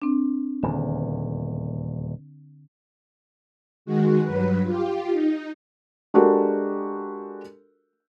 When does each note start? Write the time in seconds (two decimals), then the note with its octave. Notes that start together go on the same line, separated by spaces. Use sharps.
0.02 C4 D4
0.63 D#1 E2 D3
3.85 D#3 G#3 F#4
4.24 G2 F#3 B4
4.64 F4 G4
5.12 D#4
6.14 G#3 D4 F#4 G4 A4 A#4